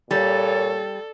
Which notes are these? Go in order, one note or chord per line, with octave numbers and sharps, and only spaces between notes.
A#2 G3 A4 C#5